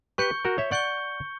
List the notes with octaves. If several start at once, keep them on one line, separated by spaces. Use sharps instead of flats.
G4 B4 C#6 G6 C#7 G7
F#4 A#4
C#5 E5
D5 F#5 C#6 G6 C#7 G7